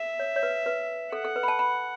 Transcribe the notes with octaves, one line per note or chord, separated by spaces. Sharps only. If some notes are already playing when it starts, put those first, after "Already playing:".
Already playing: E5
C#5
C#5
B4
B4
A4 F#5
A4
B4
B5
A5
B5